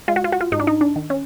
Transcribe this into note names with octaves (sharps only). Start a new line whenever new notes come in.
G#3 F4
F#4
F4
F#4
F4
G#2 D#4
D4
D#4
D4
D#3
C#4